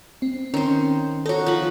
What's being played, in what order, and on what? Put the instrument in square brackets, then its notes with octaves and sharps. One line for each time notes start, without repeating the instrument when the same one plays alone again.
[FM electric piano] C4
[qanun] D#3 C5 [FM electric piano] C#4
[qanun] D#4 F#4 [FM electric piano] A4 C#5
[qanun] F3 B5